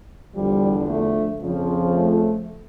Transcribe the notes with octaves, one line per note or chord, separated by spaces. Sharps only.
E2 D3 F3 G3
A3
F2 C#3 F3
A3